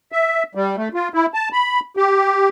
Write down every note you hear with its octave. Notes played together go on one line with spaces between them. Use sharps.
E5
G3
A3
F4
E4
A5
B5
G4